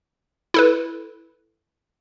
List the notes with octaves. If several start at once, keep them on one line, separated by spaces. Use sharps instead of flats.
E4 A4 B4